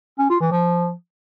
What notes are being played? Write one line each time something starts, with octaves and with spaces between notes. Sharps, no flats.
C#4
F4
E3
F3